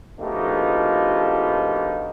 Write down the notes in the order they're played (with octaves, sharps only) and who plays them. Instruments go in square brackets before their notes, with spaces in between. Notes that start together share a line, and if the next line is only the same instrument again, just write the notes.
[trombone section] A#1 B2 A3 D#4 F4 G4